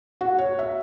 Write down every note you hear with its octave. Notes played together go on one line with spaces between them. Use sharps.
F#4
C#5
E5